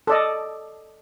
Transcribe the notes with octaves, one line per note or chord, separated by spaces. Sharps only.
A4 D5 D#5